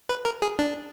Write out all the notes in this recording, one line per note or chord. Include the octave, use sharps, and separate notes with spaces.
B4
A#4
G#4
D4